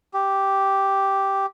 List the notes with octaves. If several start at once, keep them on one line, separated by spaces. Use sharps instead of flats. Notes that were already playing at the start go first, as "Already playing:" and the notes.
G4